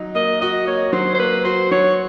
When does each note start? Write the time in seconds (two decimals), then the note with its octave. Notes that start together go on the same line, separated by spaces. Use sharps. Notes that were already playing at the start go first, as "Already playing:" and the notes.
Already playing: F#3 D#4
0.15 A#3 D#5
0.41 F#4 D#5
0.67 A#3 C#5
0.93 F#3 C5
1.14 C5
1.19 A#3 B4
1.45 F#4 C5
1.71 F#3 C#5